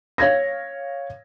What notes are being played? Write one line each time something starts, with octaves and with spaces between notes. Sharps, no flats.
C#5 F5 G#6 A#6